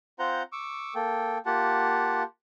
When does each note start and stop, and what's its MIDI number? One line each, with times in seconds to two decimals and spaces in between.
0.19 0.43 60
0.19 0.43 65
0.19 0.43 72
0.19 0.43 78
0.19 0.43 82
0.19 0.43 91
0.52 0.94 85
0.52 0.94 86
0.52 0.94 88
0.95 1.38 58
0.95 1.38 69
0.95 1.38 79
1.46 2.23 58
1.46 2.23 65
1.46 2.23 67
1.46 2.23 78
1.46 2.23 81